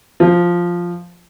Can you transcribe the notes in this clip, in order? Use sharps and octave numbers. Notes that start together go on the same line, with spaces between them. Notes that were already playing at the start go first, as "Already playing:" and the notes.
F3